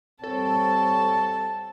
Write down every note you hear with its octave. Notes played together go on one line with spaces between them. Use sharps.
G3 C4 A4 C#5 A5